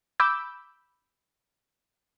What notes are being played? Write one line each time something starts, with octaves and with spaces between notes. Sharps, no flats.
B5 D6 E6 G6